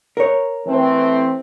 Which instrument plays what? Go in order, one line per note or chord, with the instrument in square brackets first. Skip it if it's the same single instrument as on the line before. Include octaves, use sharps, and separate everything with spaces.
[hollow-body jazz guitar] A#4 C#5
[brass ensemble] E3 A3 C4